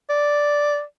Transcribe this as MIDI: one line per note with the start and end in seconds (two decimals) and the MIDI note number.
0.10 0.83 74